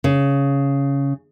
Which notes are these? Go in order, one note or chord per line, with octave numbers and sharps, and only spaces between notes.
C#3